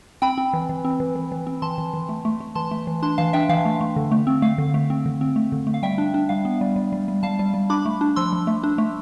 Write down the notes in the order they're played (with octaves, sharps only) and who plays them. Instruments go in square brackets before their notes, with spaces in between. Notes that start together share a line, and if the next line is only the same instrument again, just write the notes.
[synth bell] C4 G5 B5
C4
E3
E3
C4
E3
E3
E3
C4
E3 A5 C6
E3
E3
A3
A3
A3
E3 A5 C6
A3
E3
D4 A5 C6
E3 F5 A5
D4 E5 G5
E3 F5
A3
A3
D3
A3
C4
A3 F5
D3
A3
C4
D3
C4
A3
D3
A3
F5
G3 E5 G5
D4
D4
G3 F5
B3
G3
G3
G3
G3
G3 F5 A5
G3
G3
D4 B5 D6
A3
D4
F3 C6 E6
F3
A3
D4
A3